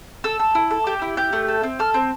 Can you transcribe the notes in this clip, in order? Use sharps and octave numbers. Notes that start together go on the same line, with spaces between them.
A4 E6
A4
E4
A4
G4
E4
G4 G6
A3
A4
C4
A4 F6
C4